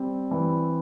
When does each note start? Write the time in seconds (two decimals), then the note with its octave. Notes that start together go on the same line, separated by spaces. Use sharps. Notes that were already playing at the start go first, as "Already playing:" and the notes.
Already playing: G3 C4
0.31 E3